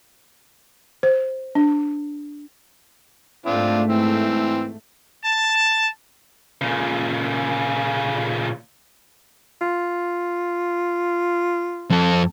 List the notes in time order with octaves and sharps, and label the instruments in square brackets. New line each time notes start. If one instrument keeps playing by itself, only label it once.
[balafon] C5
D4
[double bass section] G#2 A3 [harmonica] C4 D4 F4
[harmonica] E3 C4
[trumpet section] A5
[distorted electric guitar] A#2 C#3
[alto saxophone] F4
[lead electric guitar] F2 A4